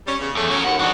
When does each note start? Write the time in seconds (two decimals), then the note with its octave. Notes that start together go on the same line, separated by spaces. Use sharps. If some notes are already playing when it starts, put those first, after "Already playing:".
0.06 G3 C#4
0.19 E2 C#3
0.35 E2 A3
0.50 C#3 A3 C#4 F#4 A#4
0.64 D#2 F#5
0.79 F2 G#2 E3 D4 F#4